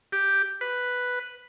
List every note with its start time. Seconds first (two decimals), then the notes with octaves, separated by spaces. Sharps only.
0.12 G4
0.61 B4